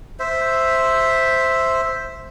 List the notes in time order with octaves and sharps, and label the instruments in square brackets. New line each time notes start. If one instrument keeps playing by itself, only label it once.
[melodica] C5 E5